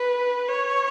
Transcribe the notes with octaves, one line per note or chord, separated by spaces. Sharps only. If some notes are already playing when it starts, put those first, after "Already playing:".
Already playing: B4
C#5